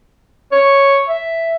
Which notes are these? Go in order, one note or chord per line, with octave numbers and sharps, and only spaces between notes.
C#5
E5